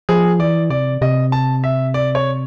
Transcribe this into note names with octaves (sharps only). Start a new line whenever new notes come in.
F3 G#4
E3 D5
C3 D5
C3 D#5
A5
E5
D5
C#5